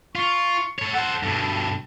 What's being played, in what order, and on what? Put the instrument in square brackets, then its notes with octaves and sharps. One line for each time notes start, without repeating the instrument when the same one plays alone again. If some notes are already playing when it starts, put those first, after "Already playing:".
[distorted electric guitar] F4 [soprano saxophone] C#6
[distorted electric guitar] A4 C#5
[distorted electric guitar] A4 C5 [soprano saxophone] F#5
[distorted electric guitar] G2 B2 [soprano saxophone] A4